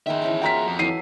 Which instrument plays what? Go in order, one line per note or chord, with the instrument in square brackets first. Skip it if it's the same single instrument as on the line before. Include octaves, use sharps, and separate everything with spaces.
[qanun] D#3 B4 C5 [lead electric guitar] G#4 E5
[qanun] E3 C#4 A5
[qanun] F4 F#4 A#4 [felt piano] G5 A#5 B6
[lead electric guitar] F2
[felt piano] E3 C7 D#7 [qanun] F#3 A4